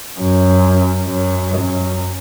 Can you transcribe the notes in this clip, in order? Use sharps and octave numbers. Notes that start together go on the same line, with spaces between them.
F#2
F#2
F#2